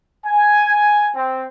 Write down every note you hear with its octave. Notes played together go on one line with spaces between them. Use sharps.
G#5
C4